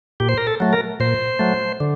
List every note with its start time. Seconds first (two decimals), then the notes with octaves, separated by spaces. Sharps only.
0.20 A#2 G4
0.29 C5
0.38 A#4
0.47 A4
0.60 F#3 A3
0.73 A#4
1.00 A#2 C5
1.39 F#3 A3
1.80 D3